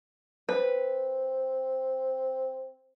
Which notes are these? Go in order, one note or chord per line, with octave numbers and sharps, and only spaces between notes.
C4 B4